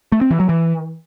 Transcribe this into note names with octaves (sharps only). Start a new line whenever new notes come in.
A3
C4
E3
F#3
E3